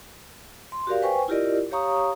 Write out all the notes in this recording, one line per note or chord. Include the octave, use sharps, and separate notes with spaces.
C6
F#4 G4 A#4 D5 F5
B4 C5 G5 G#5 C#6
E4 F4 G4 A#4 D5 D#5
G4 C#5 F5 A#5 C#6 D#6